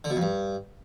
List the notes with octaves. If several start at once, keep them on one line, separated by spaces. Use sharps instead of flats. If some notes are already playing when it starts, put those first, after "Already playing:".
D3
B2
F2
G2